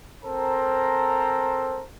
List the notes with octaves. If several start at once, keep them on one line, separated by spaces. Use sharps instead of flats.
C4 A4 A#4 C5 A#5